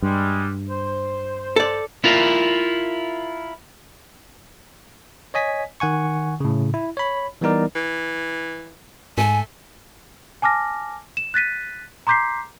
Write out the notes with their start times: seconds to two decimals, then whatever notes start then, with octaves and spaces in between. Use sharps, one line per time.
0.02 G2 G3 G#3
0.69 C5
1.56 A4 D5
2.04 E4 F4 A#4
5.34 C#5 D#5 G#5 B6
5.80 D#3 F#5 G#5 C#6
6.40 A2 C#3
6.74 E4
6.97 C#5 B5
7.41 E3 G3 B3 D#4 A#4 D5
7.75 E3
9.18 G#2 A3 G#5
10.42 G#5 A5 D6 F6 A#6
11.17 E7
11.34 F#6 A6 B6 D#7
12.07 A#5 C6 D6 G6 B6 C7